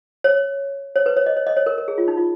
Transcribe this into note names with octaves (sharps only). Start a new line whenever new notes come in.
C#5
C#5
B4
C#5
D#5
C#5
D#5
C#5
A#4
A#4
G#4
F4
D#4
F4